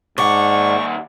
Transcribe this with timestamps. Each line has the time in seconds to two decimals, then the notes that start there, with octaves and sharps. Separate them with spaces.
0.18 D#2 G#2 D4 F#5 C#6